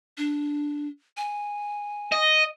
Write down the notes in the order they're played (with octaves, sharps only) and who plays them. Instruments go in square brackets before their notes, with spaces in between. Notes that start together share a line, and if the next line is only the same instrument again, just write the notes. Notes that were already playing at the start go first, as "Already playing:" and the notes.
[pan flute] D4
G#5
[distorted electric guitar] D#5